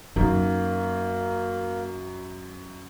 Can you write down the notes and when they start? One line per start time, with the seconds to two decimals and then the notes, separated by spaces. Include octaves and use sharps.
0.16 F#2 A#3 D#4